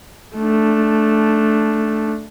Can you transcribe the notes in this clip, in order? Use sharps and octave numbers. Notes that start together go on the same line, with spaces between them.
A3 D4